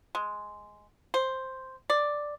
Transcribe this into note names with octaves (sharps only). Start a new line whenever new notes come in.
G#3
C5
D5